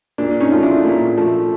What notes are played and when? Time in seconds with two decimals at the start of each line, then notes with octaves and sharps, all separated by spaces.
0.18 A#2 D4
0.40 C#4 D#4
0.52 F3 A3 F4
0.62 D4 E4
0.84 A#2
1.17 F3 A3